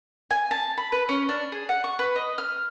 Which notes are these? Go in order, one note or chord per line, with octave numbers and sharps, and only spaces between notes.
G#5
A5
B5
B4
C#4
D4
G#4
F#5
C#6
B4
D#5
F6